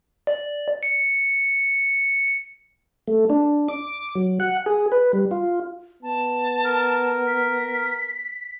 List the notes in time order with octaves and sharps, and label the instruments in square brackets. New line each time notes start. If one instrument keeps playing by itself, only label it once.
[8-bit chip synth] D5
C#7
[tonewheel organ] A3
D4
D6
F#3
F#5
G#4
B4
G3
F4
[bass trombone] B3 [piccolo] A5
[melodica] A#4
[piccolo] B6